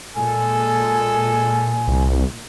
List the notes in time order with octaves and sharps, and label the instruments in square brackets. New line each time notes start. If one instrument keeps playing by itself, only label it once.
[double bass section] A#2 [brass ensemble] G#3 A4 [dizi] G#5
[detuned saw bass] C2